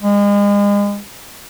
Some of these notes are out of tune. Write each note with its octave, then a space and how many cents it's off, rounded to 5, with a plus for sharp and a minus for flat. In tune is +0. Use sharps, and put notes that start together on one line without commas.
G#3 -35